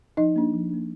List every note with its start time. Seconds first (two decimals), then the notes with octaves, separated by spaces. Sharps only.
0.17 F3 D#4 D#5
0.36 A#3 D4
0.53 F3
0.70 A#3 D4